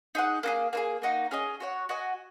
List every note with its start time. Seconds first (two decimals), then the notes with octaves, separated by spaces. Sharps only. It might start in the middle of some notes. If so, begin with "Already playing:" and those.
0.15 D#4 G#4 F#5
0.43 A#3 D#4 G#4
0.73 A#3 D#4 G#4
1.02 A#3 D#4 F#4
1.31 C#4 G#4 D#5
1.60 F#4 C#5 F#5
1.89 F#4 D#5 G#5